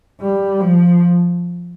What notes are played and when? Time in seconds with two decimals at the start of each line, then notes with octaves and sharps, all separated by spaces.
0.22 G3
0.61 F3